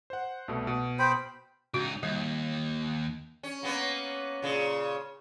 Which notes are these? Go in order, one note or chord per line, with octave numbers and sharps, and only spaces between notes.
C5 F#5
C2 B2 A3
B2
C5 G5 B5
C#2 D#4 F#4
D#2 G3
C#4
A#3 B3 C#4
A#2 C#3